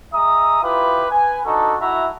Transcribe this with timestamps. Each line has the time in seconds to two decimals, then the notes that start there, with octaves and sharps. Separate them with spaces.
0.13 G#3 E5 A#5 D#6
0.62 E4 F4 G4 B4
1.11 B4 G#5
1.45 D4 D#4 F#4 A4
1.79 E4 F#4 E5 A#5